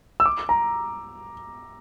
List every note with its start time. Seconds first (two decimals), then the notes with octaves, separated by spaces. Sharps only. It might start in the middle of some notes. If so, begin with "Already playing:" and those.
0.20 E6
0.26 D6
0.49 A#5